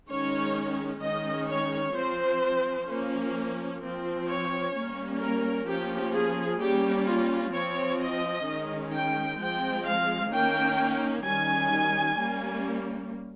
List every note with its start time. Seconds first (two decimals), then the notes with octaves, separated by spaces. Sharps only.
0.10 D#3 G#3 C#4 C#5
1.02 D#3 G#3 C#4 D#5
1.49 C#5
1.95 F3 C4 C5
2.88 F3 A#3 C#4
3.82 F3 C4
4.27 C#5
4.74 G3 A#3 C#4
5.20 A#4
5.67 F3 A#3 C#4 G4
6.14 G#4
6.60 G3 A#3 C#4 G4
7.06 F4
7.53 F3 C4 C#5
8.00 D#5
8.46 D#3 G#3 C#4
8.92 G5
9.38 F3 G#3 C4 G5
9.85 F5
10.31 D#3 A#3 C#4 G5
11.24 D#3 G3 C#4 G#5
12.17 G3 A#3 C#4